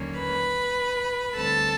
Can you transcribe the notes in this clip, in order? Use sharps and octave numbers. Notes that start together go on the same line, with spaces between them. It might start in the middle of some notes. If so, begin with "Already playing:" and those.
Already playing: D#2 D3 F#3 A#3 C#4
B4 B5
D2 D3 G3 C4 A4 A5